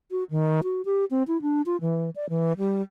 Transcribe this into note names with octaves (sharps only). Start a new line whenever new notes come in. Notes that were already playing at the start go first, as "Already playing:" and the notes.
F#4
D#3
F#4
G4
C4
E4
D4
F4
E3
D5
E3
G3